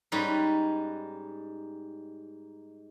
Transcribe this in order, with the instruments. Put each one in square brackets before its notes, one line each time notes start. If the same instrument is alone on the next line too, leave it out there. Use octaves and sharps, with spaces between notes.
[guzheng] G#2 G3 C#4 D#4 B4